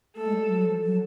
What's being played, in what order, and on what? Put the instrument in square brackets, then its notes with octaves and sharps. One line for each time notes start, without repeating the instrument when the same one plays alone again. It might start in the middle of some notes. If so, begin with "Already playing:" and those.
[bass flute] A3 [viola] A4
[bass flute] G#3
G3
F#3
F3
F#3